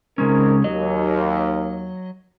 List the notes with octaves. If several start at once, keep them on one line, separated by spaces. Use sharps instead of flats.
C#3 G#3 C4 C#4 D#4 A#4
D#2 F#3 D#5